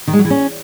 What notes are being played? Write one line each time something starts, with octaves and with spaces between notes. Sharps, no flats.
D#3
G#3
F#3
E3
C#4